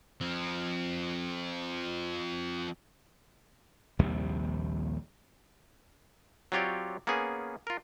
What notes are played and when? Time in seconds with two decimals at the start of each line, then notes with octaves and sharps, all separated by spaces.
0.21 F3 C4
3.99 A#1 D#2 C3 G3
6.52 F#3 C4 F4 G4 C#5 D5
7.07 A#3 B3 C#4 G#4
7.67 F4 A#4